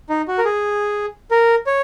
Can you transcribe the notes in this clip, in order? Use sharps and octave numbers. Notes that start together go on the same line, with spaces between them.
D#4
F#4
A#4
G#4
A#4
C#5